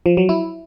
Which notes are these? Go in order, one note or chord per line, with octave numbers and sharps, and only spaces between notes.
F3
F#3
E4